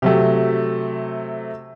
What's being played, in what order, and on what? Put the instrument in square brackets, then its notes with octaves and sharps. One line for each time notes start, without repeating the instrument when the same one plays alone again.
[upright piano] C3 F#3 A3 G4